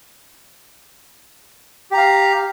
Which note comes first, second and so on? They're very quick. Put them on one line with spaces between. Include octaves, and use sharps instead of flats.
G4 A#5 F5